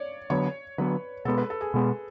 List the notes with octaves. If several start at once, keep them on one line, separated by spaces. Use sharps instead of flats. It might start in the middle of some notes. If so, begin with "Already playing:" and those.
Already playing: C#5 D5
D3 F#3 B3 C#5
D3 F#3 B3 B4
B2 G#3 B3 A4
B4
A4
G#4
B2 G#3 B3